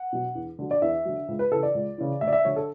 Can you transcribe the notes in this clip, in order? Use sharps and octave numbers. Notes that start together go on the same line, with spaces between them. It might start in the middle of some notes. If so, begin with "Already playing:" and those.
Already playing: F#5
B2 F#3
E2
D3 F#3
D5
E2 E5
D3 F#3
C#2
B4
C#3 E3 A4
D5
C#2
C#3 E3
D2 E5
D5
E5
D3 F#3 C#5
A4